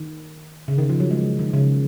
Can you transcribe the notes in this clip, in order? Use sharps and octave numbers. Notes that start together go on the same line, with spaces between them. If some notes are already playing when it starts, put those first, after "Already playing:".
Already playing: D#3
C#3
D#3
F3
F#3
G#3
D#3
C#3